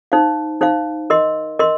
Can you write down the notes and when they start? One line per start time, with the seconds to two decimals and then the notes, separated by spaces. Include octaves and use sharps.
0.12 D#4 C5 F5
0.61 D#4 C5 F5
1.10 A#4 D#5 C6
1.59 A#4 D#5 C6